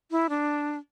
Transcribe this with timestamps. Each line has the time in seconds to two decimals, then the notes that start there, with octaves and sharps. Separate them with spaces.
0.11 E4
0.29 D4